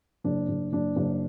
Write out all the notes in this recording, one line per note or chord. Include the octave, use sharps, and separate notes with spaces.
F#1 D4
F#1
F#1 D4
F#1